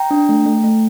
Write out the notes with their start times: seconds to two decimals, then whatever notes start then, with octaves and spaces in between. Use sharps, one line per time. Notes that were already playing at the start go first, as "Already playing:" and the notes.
Already playing: G5 A#5
0.11 D4
0.29 A3
0.46 A3
0.64 A3